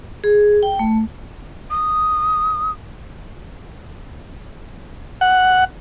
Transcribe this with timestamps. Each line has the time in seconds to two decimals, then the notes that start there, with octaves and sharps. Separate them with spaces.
0.24 G#4
0.63 G5
0.79 A3
1.70 D#6
5.21 F#5